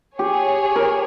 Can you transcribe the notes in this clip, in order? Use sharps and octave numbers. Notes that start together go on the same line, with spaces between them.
G4 G#4 C#5 G#5
A#4